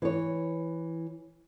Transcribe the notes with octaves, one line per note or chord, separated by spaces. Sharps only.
E3 C#5